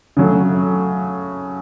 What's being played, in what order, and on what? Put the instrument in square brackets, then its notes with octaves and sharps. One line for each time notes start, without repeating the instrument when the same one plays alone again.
[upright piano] C#3 F#3 A3